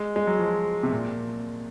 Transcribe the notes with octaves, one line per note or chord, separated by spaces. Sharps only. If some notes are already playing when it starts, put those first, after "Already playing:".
Already playing: G#3
G#3
F#3
F3
C3
A#2